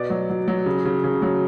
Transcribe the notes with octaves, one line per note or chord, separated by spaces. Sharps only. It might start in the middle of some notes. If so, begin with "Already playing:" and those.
Already playing: B2 D5
F#3
F#3
F#3
C#3
C#3
C#3
F#3